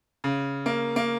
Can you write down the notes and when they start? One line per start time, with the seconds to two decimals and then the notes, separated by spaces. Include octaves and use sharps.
0.24 C#3
0.66 A#3
0.96 A#3